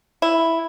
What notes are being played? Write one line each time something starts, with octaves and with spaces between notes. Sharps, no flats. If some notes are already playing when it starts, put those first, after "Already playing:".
E4